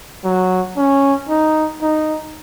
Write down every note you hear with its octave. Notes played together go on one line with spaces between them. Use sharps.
F#3
C#4
D#4
D#4